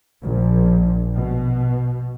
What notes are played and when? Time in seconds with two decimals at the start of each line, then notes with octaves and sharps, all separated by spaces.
0.22 A#1
1.16 B2